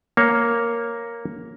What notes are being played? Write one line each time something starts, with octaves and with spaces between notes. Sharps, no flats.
A#3 C#5